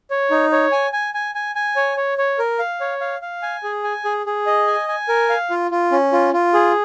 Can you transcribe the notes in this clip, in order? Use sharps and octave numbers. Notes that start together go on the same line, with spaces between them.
C#5
D#4
C#5
G#5
G#5
G#5
G#5
G#5
C#5
C#5
C#5
A#4
F5
C#5
F5
F5
G#5
G#4
G#5
G#4
G#4
D#5
G#5
G#5
A#4
F5
F4
F4
C#4
F4
F4
G#4